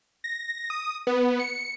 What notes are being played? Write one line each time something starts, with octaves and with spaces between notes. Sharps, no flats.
A#6
D#6
B3
C#7